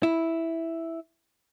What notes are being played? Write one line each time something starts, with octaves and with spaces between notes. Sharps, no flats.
E4